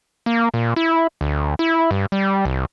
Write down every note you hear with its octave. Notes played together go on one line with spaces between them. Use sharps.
A#3
A#2
E4
D2
E4
G2
G3
C2